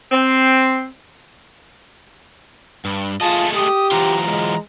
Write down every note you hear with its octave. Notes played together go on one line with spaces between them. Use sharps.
C4
G2
A3 F4 G#4 D#5 A5
G4 D#6
E3 F#3 F4 A#5
G#3